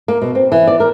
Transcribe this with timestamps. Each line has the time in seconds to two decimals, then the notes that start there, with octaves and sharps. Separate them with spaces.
0.08 A#3
0.22 B2
0.35 C4
0.52 E3
0.67 D5
0.80 A#4